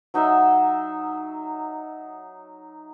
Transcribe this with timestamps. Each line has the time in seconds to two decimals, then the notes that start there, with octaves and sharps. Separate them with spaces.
0.14 F#3 D#4 D#5 E5